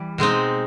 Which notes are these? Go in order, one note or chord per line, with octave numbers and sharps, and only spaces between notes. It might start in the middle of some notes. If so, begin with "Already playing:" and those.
Already playing: E3 G3
B2 G#3 C4 D#4